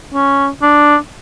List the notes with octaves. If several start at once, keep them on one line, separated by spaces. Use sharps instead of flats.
C#4
D4